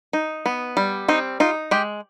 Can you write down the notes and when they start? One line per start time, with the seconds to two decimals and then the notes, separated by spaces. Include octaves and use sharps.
0.13 D#4
0.46 B3
0.77 G3
1.08 C4 D#4
1.40 D#4 F4
1.71 G#3 G4